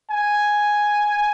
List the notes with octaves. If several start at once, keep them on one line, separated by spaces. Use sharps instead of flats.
G#5